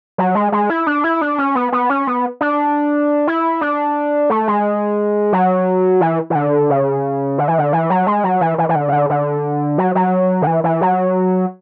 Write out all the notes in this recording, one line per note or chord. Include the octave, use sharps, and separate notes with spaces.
F#3
G#3
G#3
E4
D4
E4
D4
C#4
B3
B3
C#4
B3
D4
E4
D4
A3
G#3
F#3
E3
E3
D3
C#3
D3
E3
D3
E3
F#3
G#3
F#3
E3
E3
E3
D3
C#3
D3
D3
F#3
F#3
D3
E3
E3
F#3